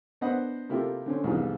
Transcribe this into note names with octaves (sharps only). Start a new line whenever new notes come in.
B3 D4 C5 D#5 F#5 B5
C3 A#3 E4 F4 G4 A4
D3 C4 C#4
C2 F2 G#2 E3 B3